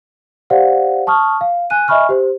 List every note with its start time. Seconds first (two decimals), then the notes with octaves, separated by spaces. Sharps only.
0.50 G4 C5 D5 F5 F#5
1.07 A5 C#6 D#6 F6
1.41 F5
1.70 G#5 F#6 D#7
1.88 D#5 E5 G#5 B5 C#6 F6
2.09 G4 C5